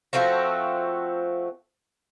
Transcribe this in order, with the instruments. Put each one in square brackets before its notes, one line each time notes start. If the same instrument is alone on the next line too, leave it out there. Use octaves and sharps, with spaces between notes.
[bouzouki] F3 A3 C4 F#4